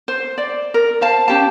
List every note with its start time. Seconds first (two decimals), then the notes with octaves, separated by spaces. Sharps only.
0.08 C5
0.38 D5
0.74 A#4
1.01 C5 F5 A5
1.28 C#4 G4 A5